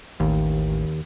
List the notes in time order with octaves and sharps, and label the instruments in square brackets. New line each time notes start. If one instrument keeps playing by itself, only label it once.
[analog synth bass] A1 [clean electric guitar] D#2